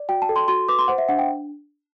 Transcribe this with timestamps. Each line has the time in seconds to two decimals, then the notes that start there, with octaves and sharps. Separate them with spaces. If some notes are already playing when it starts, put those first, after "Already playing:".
Already playing: D5
0.09 F#4 G5
0.22 A5
0.29 A4
0.36 C6
0.48 F#4 C6
0.69 B4 D6
0.79 C6
0.88 C5 F#5
0.98 E5
1.09 D4 F#5
1.19 G5